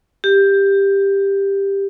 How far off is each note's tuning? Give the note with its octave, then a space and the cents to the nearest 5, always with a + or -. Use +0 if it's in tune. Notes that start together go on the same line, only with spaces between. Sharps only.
G4 +10